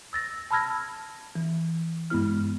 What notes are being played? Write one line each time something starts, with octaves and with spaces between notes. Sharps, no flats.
E6 A6 A#6
A5 B5 E6 F6 G#6 A#6
E3
G2 G#3 B3 E4 F6